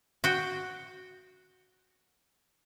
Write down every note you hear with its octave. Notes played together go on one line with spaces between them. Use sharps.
F#4 G5